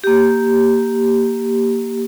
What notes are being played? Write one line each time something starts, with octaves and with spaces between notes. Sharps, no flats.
A#3 G4